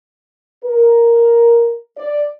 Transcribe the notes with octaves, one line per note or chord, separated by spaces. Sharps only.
A#4
D5